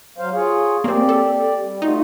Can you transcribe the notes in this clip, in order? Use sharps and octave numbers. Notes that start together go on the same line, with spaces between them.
F#3 C5 F5
F4 G#4 C#5
A#3 C4 G4 D5
A4
G3
A3 D#4 F4 F#4